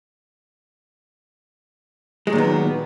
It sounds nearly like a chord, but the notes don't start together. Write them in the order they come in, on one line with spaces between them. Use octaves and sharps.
G#3 F#3 A#2 D#3 B3